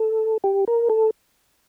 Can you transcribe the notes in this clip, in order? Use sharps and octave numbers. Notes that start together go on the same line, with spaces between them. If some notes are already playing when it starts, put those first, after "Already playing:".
Already playing: A4
G4
A#4
A4